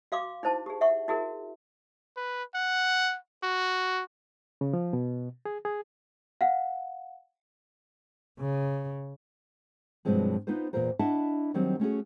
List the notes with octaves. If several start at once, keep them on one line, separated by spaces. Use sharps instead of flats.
F#4 F5 C6 D6
D#4 E4 C5 A5
G4 G#4
E5 F#5 C#6
E4 F#4 G#4 A#4
B4
F#5
F#4
C#3
F3
B2
G#4
G#4
F5 F#5
C#3
G2 B2 F3 F#3 G#3 C4
B3 D#4 F4 B4 C5
E2 A#2 B3 F4 A#4 C5
D4 E4 D#5 E5 F#5 A5
D#3 F#3 G3 C4
A3 C#4 F#4 G#4